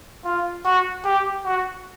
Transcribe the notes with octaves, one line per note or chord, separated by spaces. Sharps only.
F4
F#4
G4
F#4